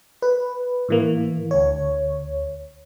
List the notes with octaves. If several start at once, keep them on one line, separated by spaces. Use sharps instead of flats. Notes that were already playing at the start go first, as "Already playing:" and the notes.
B4
A2 E3 A#3
D2 C#5